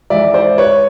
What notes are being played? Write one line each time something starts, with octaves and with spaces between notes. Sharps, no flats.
G#2 E3 D5 E5
C5 D5
B4 C#5